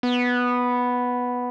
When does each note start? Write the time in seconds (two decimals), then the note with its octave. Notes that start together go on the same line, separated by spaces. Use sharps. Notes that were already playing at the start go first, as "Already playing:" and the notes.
0.03 B3